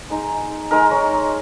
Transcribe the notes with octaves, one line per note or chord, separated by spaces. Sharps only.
G#3 D#4
G#3 D#4 A#4
C#5